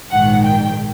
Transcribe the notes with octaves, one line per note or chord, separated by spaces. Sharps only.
A#1 G#2 D#3 F#5
G5